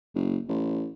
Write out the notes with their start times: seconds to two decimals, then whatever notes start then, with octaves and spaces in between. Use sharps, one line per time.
0.15 F#1
0.48 A1